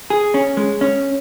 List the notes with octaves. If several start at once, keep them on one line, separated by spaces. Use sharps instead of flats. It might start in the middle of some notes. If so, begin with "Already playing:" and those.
G#4
C#4
G#3
C#4